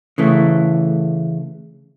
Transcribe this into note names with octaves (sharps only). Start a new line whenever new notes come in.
C#3 E3 A3